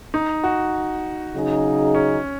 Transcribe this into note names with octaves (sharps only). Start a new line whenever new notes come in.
D#4
F#4
C#3 F#3 D#4 G#4
C#4